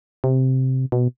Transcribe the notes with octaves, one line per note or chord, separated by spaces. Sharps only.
C3
B2